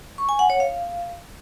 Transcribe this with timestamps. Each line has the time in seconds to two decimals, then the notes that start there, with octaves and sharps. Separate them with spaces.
0.18 C#6
0.29 G#5
0.39 F#5
0.50 C#5
0.60 F5